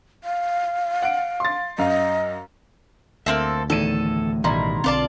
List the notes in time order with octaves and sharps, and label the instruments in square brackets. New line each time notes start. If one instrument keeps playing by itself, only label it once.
[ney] F5
[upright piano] F#5 D7
C6 A6
[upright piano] F#2 F5 [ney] D#5
[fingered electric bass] D2 [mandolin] A#3 C4 A4 [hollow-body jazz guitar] E5
[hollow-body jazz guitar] E2 A2 [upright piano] D#3 D#7 [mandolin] A4
[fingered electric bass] A1 [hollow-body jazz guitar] B2 D#3 G3 [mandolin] E4 [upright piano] A#5 C6
[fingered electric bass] B1 D3 C4 [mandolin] F4 D5 A5